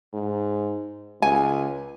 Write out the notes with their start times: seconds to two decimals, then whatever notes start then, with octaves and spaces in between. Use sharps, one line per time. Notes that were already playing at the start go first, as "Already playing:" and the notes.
0.14 G#2
1.22 C#2 G#5